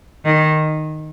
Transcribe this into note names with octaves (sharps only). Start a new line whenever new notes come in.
D#3